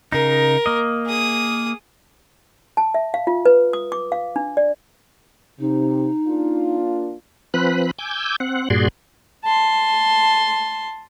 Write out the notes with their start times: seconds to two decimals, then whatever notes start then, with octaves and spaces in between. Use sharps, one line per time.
0.12 C#3 D#4 A#4
0.66 A#3 D#5
1.06 G#4 D#6
2.77 A5
2.94 E5
3.14 F5
3.27 F4
3.46 B4
3.73 D#6
3.92 D6
4.12 F5
4.36 D4
4.57 D5
5.60 C3 D#4
6.27 A#3 D4 F4
7.54 F3 C4 B4 B5 F#6
7.99 G#5 D6 E6 G6
8.40 C4 F#5
8.70 G2 A#2 F#4 G#4 D5 C6
9.44 A5 C6